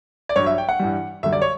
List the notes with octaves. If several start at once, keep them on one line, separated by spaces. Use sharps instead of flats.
D5
G2 F#3 C#5
E5
G5
F#5
G2 E3 G3
F#2 D3 G3 E5
D5
C#5